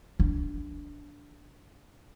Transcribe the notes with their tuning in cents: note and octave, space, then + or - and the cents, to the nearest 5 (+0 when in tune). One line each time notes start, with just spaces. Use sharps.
D4 -10